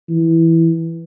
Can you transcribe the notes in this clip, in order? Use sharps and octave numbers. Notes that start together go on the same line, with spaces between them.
E3